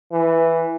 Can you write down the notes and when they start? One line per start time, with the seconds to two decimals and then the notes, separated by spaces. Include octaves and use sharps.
0.12 E3